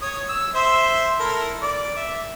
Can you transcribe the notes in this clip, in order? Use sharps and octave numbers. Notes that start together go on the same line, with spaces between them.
C#5 D#6
E6
C5 E5 C6
E4 A4 A#4
D5
E5